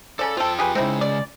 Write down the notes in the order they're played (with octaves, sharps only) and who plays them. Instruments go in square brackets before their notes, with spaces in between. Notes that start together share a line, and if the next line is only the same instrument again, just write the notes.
[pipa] C#3 C#4 D5 [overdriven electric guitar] A4
[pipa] C4 A4 [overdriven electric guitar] F4 G5
[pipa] G4 G#4 B4
[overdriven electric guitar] C#3 G#3 [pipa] C4 D#4 E4
[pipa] D5